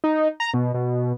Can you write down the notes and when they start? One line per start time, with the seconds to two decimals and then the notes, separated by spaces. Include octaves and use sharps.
0.04 D#4
0.40 A#5
0.54 B2
0.74 B2